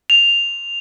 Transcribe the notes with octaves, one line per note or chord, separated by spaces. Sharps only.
F7